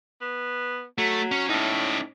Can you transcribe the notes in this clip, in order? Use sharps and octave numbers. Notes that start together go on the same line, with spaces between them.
B3
F#3 A3
C#4
A2 C#4 D#4